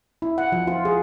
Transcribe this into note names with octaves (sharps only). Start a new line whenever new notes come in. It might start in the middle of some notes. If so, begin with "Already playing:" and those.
E4
F#5
F3
F4
G#4